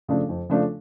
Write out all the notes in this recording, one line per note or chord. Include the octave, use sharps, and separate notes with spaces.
C#3 F3 A3 D4
F2
C#3 F3 A3 D4